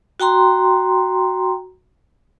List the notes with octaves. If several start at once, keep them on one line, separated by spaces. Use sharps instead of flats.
F#4 G5 A#5 C6